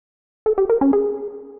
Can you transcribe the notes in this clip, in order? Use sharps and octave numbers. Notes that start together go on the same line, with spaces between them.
A4
G4
A#4
C#4
G#4